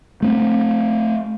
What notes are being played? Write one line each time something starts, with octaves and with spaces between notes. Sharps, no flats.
A3 B3 C4